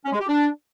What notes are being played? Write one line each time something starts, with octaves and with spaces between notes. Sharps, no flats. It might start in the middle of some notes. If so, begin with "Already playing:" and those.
C#4
G#3
G4
D4